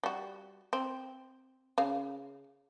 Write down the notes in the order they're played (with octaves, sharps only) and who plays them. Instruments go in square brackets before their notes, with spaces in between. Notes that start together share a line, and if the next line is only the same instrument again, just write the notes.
[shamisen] G3 F#4
C4
C#3 F5